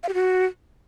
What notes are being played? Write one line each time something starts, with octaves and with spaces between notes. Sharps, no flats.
F5
G4
F#4